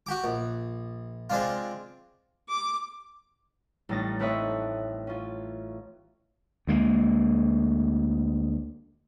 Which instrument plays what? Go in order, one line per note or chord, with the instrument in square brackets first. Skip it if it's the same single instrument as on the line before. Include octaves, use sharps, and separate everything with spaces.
[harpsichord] F#4 G4 D6
A#1
G#3 C4 D4 F4
[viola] D6
[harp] A1 G3 C#4 D#4 A6 A#6
A3 C4 B4 C#5 D#5 E5
C#4 F4
[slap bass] D2 G#3 A#3